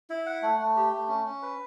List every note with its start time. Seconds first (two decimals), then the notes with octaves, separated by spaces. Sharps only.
0.10 E4
0.26 F#5
0.42 A3
0.59 A3
0.76 G4
0.92 A3
1.08 C#4
1.25 C#4
1.42 B4